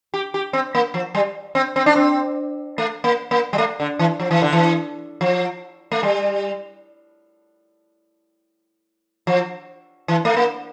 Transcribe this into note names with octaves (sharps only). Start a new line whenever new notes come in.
G4
G4
C4
A#3
F3
G3
C4
C4
D4
C4
A3
A#3
A#3
G3
A3
D3
E3
F3
E3
D3
E3
F3
A3
G3
F3
E3
A3
A#3